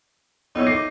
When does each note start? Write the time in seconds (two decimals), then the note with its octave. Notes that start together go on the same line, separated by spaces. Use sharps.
0.55 B1 D#4 E4 C#5
0.67 D6 A#6 C7